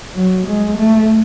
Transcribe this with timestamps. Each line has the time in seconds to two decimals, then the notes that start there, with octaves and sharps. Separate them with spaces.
0.15 F#3
0.46 G#3
0.78 A3